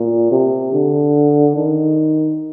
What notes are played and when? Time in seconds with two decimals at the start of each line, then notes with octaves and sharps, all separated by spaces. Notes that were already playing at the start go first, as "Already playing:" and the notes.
Already playing: A#2
0.31 C3
0.73 D3
1.57 D#3